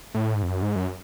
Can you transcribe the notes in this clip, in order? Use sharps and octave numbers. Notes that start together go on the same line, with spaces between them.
A2
G#2
F2
F#2
G#2
F#2